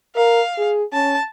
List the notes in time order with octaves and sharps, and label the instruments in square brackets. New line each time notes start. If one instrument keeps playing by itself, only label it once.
[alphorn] A#4 [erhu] F5
[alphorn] G#4
[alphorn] C#4 [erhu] A5